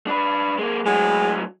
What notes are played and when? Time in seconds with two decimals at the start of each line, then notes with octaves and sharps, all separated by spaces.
0.07 D4 B4
0.58 G#3 A#3
0.86 A2 F#3 G#3